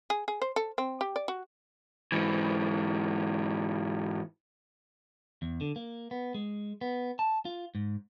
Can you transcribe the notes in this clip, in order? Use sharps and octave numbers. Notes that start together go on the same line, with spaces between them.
G#4
G#4
C5
A4
C4
G4
D5
F#4
G#2 E3
E2
D3
A#3
B3
G#3
B3
A5
F4
G#2